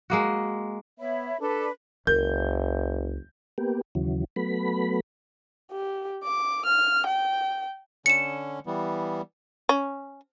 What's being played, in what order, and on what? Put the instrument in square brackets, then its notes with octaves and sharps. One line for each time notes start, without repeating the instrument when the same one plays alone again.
[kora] G#3 A#3 F#4
[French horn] B3 [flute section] C#5 E5 B5
[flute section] D4 B4 [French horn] A4
[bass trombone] F#1 [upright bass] C#2 [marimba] A#4 [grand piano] G6
[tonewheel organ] A#3 B3 G4
D#2 C#3 E3 F#3
F#3 A3 B3 B5
[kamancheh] G4
D6
F6
G5
[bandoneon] D3 C#4 [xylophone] C#7 E7
[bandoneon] E3 G3 B3
[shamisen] C#4